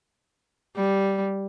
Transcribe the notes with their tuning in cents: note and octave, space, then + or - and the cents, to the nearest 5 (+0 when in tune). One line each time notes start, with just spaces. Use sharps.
G3 -5